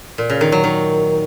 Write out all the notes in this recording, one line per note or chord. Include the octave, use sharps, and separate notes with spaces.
A#2
C#3
D#3
F#3
D#3